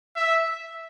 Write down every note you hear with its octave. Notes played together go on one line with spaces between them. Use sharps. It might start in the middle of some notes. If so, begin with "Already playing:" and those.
E5